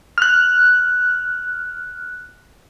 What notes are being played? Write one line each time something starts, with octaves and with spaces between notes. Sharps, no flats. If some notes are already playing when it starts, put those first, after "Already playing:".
F6 F#6